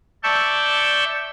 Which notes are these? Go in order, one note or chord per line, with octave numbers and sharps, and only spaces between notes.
D5 E5 A5 C#6 E6 G6